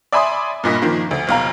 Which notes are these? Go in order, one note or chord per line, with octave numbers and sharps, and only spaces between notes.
D5 E5 G#5 B5 C6 D#6
G2 A#2 D#5 B6
D#3 F3 A#3
D2
F1 B1 F5 A#5